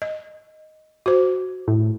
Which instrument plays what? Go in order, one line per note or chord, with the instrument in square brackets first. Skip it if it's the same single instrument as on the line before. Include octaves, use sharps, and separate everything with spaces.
[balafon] D#5
F#4 C5
[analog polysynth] A2